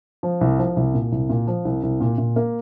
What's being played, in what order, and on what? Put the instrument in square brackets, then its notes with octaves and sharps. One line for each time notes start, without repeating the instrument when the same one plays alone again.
[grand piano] F3
C2
F3
C2
A#2
C2
A#2
F3
C2
C2
A#2
A#2
A#3